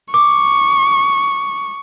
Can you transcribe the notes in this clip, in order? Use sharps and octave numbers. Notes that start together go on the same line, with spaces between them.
C#6 D6